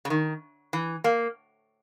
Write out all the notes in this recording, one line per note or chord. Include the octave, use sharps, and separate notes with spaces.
C#3
D#3
E3
A#3